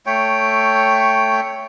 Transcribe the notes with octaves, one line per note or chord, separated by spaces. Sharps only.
A3 C#5 G5